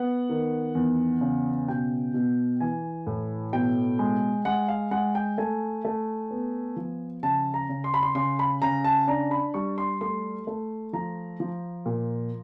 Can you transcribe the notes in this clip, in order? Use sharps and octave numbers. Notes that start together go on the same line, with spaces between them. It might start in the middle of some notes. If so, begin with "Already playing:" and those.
Already playing: B3 F#5
D#3
E2
C#3
B2 G5
B2
E3 G#5
A2
B2 G5
G#3
G#3 F#5
F5
G#3 F#5
G5
A3 G#5
A3
B3
F3
C#3 A5
A#5
C#3
C6
B5
C6
C#3 C6
B5
C#3 A#5
A5
D4 A#5
B5
G3 C#6
C6
A3 C6
A3
F3 A#5
F3
A#2